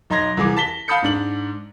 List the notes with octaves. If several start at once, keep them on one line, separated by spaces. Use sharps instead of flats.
B1 D#4 A#5 C6 G#6 A#6
C2 E3 G#4 D6
A5 B6 G7
F5 A5 B5 D#6 G6 C#7
G#2 D4 F#7